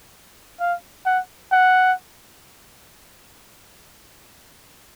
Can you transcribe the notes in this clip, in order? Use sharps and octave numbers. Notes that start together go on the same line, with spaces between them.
F5
F#5
F#5